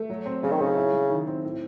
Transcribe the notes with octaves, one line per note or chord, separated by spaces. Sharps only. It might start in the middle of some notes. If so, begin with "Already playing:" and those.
Already playing: A3
F#3
C4
C#3 F#3
D#3
C#3 D#4
E4
F#3
D#3
C4
A2